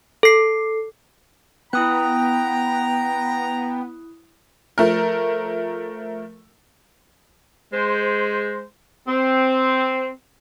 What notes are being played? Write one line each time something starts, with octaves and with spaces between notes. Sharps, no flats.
A4 C7
B3 E4 G5 A#5 D#6 F#6
F3 A3 A#4
G#3 C5
C4